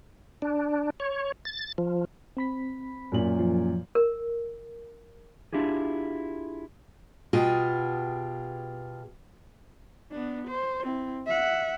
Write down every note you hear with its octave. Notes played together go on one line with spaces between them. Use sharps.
D4
C#5
A6
F3
C4 B5 B6
F#2 A#2 F#7
F3
A#4
D4 E4 F4 G4 G#4
B2 F4 G4 G#4
B3 D4
C5
C4 E4
E5 F#5